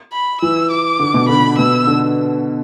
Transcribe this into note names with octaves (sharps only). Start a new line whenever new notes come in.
B5
E3 E6
D6
D3
B2
D3 B5
B2 E6
D3